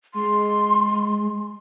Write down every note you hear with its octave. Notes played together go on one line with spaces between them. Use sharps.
G#3 C6